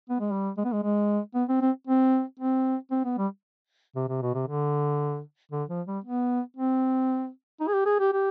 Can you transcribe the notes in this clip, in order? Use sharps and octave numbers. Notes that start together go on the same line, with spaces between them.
B3
G#3
G3
G#3
B3
G#3
G#3
B3
C4
C4
C4
C4
C4
B3
G3
C3
C3
B2
C3
D3
D3
F3
G3
B3
C4
D#4
G#4
G4
G#4
G4
G4